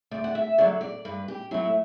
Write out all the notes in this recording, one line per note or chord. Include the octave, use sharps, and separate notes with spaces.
D2 D5
F#5
E5
D3 F#3 D5
D5
G2 B4
G4
F#3 A3 E4